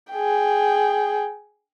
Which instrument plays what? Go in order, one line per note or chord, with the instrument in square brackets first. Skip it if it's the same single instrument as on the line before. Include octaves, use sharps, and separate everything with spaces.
[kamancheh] G#4 G5